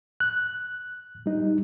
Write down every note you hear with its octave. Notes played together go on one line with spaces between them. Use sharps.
F#6
G3 D#4